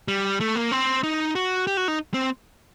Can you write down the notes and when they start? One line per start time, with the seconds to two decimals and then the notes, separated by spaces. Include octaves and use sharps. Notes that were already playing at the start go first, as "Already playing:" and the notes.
0.08 G3
0.40 A3
0.55 A#3
0.71 C4
1.03 D#4
1.35 F#4
1.67 G4
1.77 F#4
1.88 D#4
2.14 C4